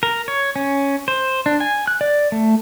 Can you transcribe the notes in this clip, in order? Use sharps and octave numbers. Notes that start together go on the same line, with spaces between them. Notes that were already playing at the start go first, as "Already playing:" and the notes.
A#4
C#5
C#4
C5
D4
G#5
F#6
D5
A3